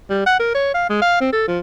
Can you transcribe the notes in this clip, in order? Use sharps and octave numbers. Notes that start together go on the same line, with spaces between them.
G3
F#5
A#4
C#5
F5
G#3
F5
C4
A4
F3